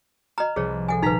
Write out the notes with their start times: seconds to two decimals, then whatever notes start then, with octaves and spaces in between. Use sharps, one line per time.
0.38 D#5 A#5 F6
0.56 C2 F3 G#4 B4 C#5
0.88 A4 F#5 G#5
1.02 D#1 D#4 B4 A#5 B6